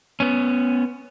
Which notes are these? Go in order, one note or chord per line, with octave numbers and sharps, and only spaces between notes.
B3 C#4